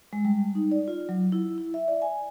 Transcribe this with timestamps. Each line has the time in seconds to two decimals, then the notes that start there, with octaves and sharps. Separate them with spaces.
0.13 G#3
0.25 G3
0.55 D#4
0.71 D5
0.88 F4
1.09 F#3
1.32 E4
1.58 E4
1.74 E5
1.88 D5
2.02 G#5